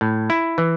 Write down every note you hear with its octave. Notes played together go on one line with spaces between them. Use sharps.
A2
E4
E3